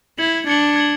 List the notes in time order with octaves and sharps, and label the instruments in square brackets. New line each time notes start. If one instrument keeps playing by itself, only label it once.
[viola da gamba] E4 [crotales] G#6 C#7 F#7
[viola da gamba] D4 [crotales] G#6 C#7 F#7
[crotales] G#6 C#7 F#7